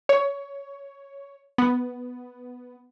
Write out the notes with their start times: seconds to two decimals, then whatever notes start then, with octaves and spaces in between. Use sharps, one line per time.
0.09 C#5
1.58 B3